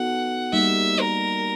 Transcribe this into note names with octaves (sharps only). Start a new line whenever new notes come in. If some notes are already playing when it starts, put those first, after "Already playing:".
Already playing: B3 D#4 F#4 A4 F#5
G3 A#3 D#4 E5
A#4